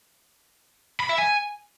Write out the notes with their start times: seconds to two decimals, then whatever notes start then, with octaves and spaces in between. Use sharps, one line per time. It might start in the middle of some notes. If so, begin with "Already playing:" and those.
1.00 B5
1.09 E5
1.18 G#5